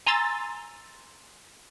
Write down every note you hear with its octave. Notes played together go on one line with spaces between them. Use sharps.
G#5 A#5 C6 E6 A6